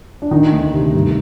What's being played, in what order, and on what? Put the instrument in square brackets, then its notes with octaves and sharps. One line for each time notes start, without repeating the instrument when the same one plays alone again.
[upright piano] D4
[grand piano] D#3 [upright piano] D#4
[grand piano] D2
C3
G2